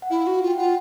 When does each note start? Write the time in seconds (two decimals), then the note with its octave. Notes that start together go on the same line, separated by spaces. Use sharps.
0.02 F#5
0.10 E4 F5
0.27 F#4
0.42 F4
0.48 G5
0.58 F4 F#5